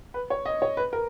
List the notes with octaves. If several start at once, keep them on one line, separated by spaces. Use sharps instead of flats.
B4
C#5
D#5
C#5
B4
A#4